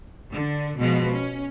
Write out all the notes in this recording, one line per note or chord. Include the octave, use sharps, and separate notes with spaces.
D3
B2 F3 G#3
C#4